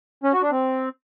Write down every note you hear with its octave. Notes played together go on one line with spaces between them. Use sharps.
C#4
F#4
D4
C4